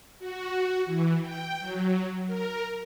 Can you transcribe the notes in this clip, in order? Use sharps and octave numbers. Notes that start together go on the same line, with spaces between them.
F#4
E3
G5
F#3
A#4